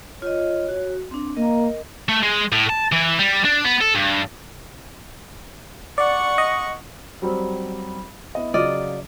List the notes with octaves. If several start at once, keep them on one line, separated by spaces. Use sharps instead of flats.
F4 C#5 D#5
F#4
C4 D4
A#3 A#4 D#5
A3
G#3
A2
A5
E3
G3
D4
B3
A4
G2
D5 F#5 C#6
D#5
F#3 G3 C4
B3 E4 D#5
C#3 F#3 F4 D5 D#5